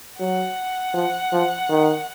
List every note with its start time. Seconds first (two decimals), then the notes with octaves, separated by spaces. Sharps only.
0.20 F#3 F#5
0.94 F3
1.32 F3
1.69 D#3